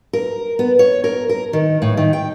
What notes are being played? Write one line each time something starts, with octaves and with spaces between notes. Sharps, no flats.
A#4
B3
C#5
A#4
A#4
D#3
A2
D#3
G5